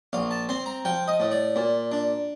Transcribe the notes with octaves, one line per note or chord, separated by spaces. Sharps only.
A#1 F5
A5
C4 C6
A#5
F3 G5
D#5
A2
D5
A#2
D4